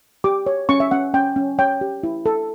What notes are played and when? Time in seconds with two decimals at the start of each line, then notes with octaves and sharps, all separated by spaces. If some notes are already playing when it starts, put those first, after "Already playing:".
0.24 G4 D6
0.46 C#5
0.69 C#4 C#6
0.80 E5
0.91 C#4 F#5
1.14 C#4 G5
1.36 C#4
1.59 C#5 G5
1.81 G4
2.03 E4
2.26 A4